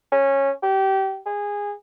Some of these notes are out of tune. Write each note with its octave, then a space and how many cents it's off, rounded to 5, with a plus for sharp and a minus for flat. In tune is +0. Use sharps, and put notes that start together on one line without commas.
C#4 -15
G4 -25
G#4 -20